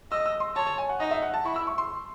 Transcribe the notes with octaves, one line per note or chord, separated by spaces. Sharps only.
D#5 E6
E6
C6
C#5 A5
A5
G#5
F#5
D#4 D#5
E5
F#5
A5
E4 C#6
E6
C#6
C6